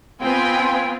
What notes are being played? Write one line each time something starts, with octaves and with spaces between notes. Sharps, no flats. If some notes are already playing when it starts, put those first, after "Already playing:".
B3 C4 F4 G5 G#5